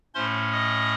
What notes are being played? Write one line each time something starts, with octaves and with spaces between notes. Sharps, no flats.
A2 A3 C#4 C5 C6
D#5 D#6